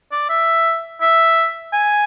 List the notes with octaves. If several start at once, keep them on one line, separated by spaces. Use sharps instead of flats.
D5
E5
E5
G#5